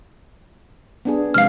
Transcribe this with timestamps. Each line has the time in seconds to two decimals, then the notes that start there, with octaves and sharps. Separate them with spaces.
1.05 B3 D4 G#4
1.34 C3 F3 G#3 F5 F6